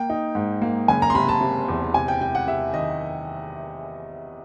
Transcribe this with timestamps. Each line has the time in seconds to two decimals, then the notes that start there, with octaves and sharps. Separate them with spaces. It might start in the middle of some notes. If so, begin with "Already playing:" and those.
Already playing: A#3 G5
0.10 D#4
0.35 G#2
0.62 A#3
0.88 F#1 G#5
1.02 A#5
1.10 C6
1.14 C3 B5
1.29 A5
1.41 C3
1.68 E2
1.94 C3 G#5
2.08 G5
2.21 C3 G5
2.35 F#5
2.47 C3 E5
2.74 D#3 D#5